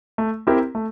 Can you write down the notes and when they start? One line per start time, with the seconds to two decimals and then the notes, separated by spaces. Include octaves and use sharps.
0.18 A3
0.47 C4 E4 G4 A#4
0.75 A3